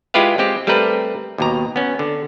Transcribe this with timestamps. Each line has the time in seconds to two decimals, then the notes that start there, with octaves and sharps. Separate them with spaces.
0.14 G#3 E4 F4 G4 B4 F5
0.38 G#3 C4 G4
0.67 G3 A3 C4 A#4 B4
1.38 D#2 B2 A#5
1.76 B3 C#4
1.99 D3